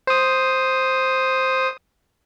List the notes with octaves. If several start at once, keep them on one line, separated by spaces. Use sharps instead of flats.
C5 D#6